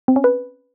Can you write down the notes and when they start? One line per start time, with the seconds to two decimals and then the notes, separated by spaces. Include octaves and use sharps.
0.08 C4
0.16 C#4
0.24 B4